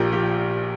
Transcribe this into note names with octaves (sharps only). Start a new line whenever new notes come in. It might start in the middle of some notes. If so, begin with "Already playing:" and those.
Already playing: A#1 A#2 F3 G4 A#4
G4